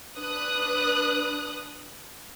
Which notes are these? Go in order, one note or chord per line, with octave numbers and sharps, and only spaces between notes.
D4 B4 D#6 F#6